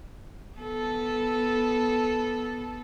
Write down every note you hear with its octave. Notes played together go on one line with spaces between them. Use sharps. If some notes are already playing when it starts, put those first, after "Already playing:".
B3 A4